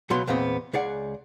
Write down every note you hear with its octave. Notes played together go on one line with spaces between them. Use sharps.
C#2 B2 F#3 B3 C6
E2 A#2 B3 C4 D#5
C#2 G#4 D5 F#5